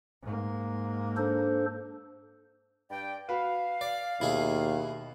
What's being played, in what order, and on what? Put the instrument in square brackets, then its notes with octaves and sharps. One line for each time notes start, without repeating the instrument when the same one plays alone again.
[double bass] G#2 A#3
[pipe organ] D4 A4 C5
[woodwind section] G2 D5 G5
[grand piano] F#4 B4 [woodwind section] F5
[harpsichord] D5
[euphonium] D#2 [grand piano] B2 [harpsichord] E4 G#4